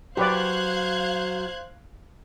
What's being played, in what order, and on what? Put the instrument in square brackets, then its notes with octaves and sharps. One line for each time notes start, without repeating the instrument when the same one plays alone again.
[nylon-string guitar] F#3 [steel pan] G4 B4 D5 [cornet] C5 [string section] F5 F#6 G#6